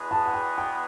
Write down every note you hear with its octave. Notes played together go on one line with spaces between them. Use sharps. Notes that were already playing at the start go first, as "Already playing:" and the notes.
Already playing: E2 B2 G#3 B3
A5
F#5
G5
G5